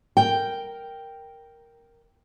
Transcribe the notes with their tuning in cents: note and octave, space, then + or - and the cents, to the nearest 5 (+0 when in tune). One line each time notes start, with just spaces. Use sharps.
A#4 +0 G5 +0